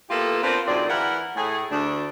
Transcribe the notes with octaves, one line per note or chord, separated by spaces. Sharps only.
A#3 B3 E4 F4 G4 A4
B3 C4 D4 F4 A#4 C5
D2 G#2 C4 F4 A#4 D5
E3 E4 A#4 F#5
A2 G#4
D2 D4